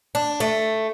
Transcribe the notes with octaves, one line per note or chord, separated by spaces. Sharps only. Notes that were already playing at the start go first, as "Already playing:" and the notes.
D4
A3